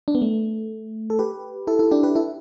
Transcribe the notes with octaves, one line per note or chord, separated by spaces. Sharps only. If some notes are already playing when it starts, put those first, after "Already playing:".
D4
B3
A3
A4
G4 B4
E4 A4
E4 A4
D4 G4
G4 B4
E4 A4